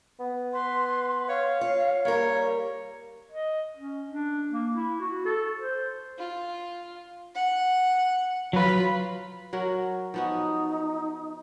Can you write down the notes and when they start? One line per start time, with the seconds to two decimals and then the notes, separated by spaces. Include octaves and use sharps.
0.20 B3
0.54 B4 C6
1.29 C#5 F5
1.61 F4 C#5
2.05 G3 A#3 A#4 C#5
3.31 D#5
3.77 C#4
4.10 D4
4.51 A#3
4.74 E4
5.00 F#4
5.25 A4
5.58 C5
6.18 F4
7.35 F#5
8.53 F#3 F4 B4 B5
9.53 F#3 F#4 A#4
10.14 F3 B3 D#4 F#4